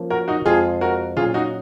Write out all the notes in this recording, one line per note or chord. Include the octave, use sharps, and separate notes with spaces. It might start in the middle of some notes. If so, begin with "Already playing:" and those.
Already playing: F3 A#3 C#4
F#4 A#4
D#4 F#4
F2 C3 F3 G#3 F4 G#4
F#4 A#4
A#2 F#3 C#4 F4 G#4
D#4 F#4